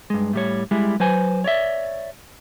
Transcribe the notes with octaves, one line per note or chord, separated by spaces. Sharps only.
G2 G#3
A2 G3 C#5
G3 G#3 E4
F#3 B4 C5 G#5
C#5 D5 E5